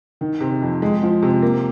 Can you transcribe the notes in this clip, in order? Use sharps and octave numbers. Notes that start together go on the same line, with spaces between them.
D#3
C3
F2
G#3
F3
C3
A#3